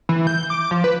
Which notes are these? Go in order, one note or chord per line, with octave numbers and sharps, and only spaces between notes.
E3
G6
D6
F3
B4